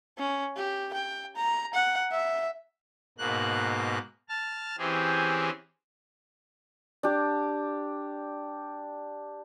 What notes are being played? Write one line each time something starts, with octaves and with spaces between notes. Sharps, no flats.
C#4
G4
G5
A#5
F#5
E5
G#2 B2 A#3 F#6
A5 F6
E3 C4 C#4 G4 G#4
D4 G4